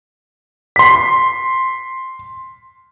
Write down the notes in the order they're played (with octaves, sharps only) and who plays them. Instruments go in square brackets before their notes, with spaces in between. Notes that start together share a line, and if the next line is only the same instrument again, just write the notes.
[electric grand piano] C6 B6